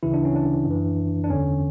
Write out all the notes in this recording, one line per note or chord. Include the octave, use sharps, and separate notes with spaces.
D2 C#3 E3 E4
D4
C#4
D4
F#2 E3
D4
E2 D3 C#4